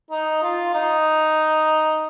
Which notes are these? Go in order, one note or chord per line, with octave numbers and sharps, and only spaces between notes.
D#4
F4
D#4